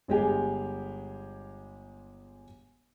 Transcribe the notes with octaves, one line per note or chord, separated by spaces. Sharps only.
G1 G#3 G4 G#4